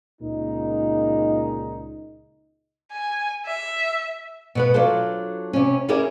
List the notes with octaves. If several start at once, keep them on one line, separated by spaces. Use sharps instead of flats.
C#2 A#2 D#4
G#5
E5
B2 B3 B4
F#3 D4 F4 A4 C5
C3 C#4
C#4 E4 G4 G#4 A#4